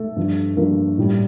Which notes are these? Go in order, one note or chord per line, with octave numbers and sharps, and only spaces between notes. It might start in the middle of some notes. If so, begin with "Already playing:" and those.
Already playing: A3 A4
G2 F3
G2 F3 A#3 A#4
A2 G3